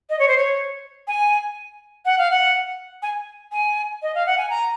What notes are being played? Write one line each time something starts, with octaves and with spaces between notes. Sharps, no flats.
D#5
C#5
C5
C#5
G#5
F#5
F5
F#5
G#5
G#5
D#5
F5
F#5
G#5
A#5